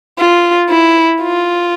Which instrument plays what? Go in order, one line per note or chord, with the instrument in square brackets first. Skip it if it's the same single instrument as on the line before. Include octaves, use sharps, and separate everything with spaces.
[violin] F4
E4
F4